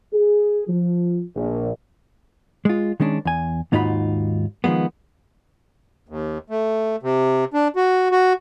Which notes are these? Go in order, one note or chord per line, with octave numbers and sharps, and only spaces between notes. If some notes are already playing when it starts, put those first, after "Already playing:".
G#4
F3
A#1
G#3 F4
D#3 G#3 C#4 D4
E2 G#5
D#2 G#2 D#4 F4 F#4 B5
D#3 F3 F#3 G#3 B3
D#2
A3
C3
D4
F#4
F#4